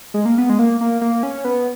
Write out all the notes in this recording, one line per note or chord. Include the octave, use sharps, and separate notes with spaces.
G#3
A#3
B3
G#3
A#3
A#3
A#3
C#4
B3